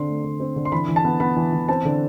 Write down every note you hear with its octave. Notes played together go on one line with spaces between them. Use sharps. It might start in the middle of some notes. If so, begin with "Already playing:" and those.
Already playing: D3 C4 C6
A3
D3
C4
D3
C6
E3 B5
E3
A5
B3
B3 B5
E3
E3
C4 A5
D3